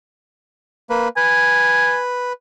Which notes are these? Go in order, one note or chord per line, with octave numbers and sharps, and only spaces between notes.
A#3 B4
B4 G#5